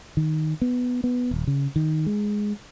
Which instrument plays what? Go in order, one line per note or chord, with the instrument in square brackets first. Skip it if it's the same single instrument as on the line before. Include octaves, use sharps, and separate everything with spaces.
[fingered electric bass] D#3
B3
B3
D#1
C#3
D#3
G#3